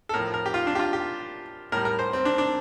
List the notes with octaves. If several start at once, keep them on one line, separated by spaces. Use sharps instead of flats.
A4
A2 F3 A#4
A#4
G4
F4
D4
G4
F4
G4
A2 G3 A#4
A#4
C5
C4
D4
D4